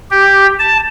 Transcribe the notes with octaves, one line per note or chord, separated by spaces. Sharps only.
G4
A5